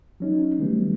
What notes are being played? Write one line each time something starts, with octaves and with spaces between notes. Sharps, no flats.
F#3 C#4 D#4
D#3 G3 A3 B3